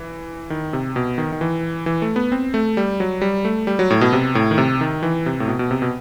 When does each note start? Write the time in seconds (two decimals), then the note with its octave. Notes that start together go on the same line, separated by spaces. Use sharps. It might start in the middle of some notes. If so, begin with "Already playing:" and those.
Already playing: E3
0.50 D#3
0.73 C3
0.96 B2
1.18 D#3
1.32 D#3
1.41 E3
1.86 E3
2.02 A3
2.16 B3
2.32 C4
2.54 A3
2.77 G3
3.00 F#3
3.21 G3
3.45 A3
3.67 G3
3.79 F#3
3.90 A2
4.01 B2
4.13 C3
4.35 A2
4.51 D#3
4.58 C3
4.81 D#3
5.03 E3
5.26 C3
5.40 A2
5.48 B2
5.59 B2
5.71 C3
5.82 B2